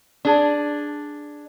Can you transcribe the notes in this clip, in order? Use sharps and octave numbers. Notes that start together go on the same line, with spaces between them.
D4 G#4